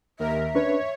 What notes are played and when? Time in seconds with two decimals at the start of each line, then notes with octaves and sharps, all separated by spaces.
0.19 D#2 A#4 E5
0.55 C#4 D4 B4 C#5